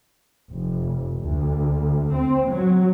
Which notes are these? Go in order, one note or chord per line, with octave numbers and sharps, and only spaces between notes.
F1
D2
C4
F#3